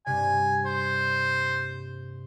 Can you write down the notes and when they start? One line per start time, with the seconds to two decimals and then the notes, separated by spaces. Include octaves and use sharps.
0.06 G2 C3 G#5
0.65 C5